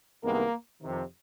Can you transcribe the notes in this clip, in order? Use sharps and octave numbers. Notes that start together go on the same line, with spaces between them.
C2 C3 D#3 G#3 A#3 B3 A#4
F2 C3 D#3